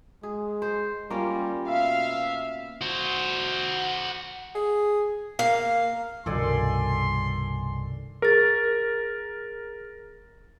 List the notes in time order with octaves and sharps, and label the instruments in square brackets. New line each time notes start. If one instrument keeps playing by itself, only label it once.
[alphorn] G#3 [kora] G#4
[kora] C5
[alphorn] G3 [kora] A#3 C#4 F4
[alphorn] B2 [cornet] E5 [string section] F5
[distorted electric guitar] F#4 C5
[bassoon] G#4
[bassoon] A#3 [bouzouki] F5
[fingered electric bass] C2 G2 [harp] B2 D#3 [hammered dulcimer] A4 D5 G#5 [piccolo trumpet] C6
[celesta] G#4 A6 [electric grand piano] A#4